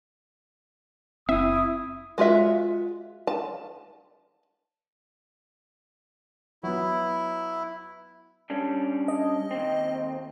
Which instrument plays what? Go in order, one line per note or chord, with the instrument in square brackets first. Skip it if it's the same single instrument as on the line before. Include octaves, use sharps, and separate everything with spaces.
[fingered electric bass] F#1 C4 [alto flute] E4 [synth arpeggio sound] E5 [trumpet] D#6
[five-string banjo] G#3 F4 F#4 E5
A5
[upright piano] F#3 B3 [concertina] E4
[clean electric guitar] G3 C#4 D4
[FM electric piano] D#5
[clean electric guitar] D#2 C4